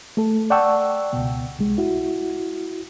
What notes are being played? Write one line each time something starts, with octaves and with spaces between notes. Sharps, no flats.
A3 A4
D5 F#5 G5 A5 C#6 E6
C#2 B2
C2 G#3
E4 F#4